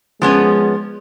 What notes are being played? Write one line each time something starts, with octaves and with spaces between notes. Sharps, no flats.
F3 G#3 B3 C#4